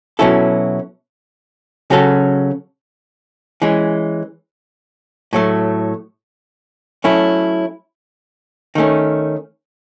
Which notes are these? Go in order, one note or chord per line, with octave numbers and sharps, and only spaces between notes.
B2 F#3 C#4 E4 A4
C#3 F#3 C#4 F#4 A4
E3 G#3 C#4
A2 F#3 A3
F#3 A3 C#4 E4
D#3 A3 C#4